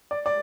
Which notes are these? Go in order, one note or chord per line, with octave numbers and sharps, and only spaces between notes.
D5
D5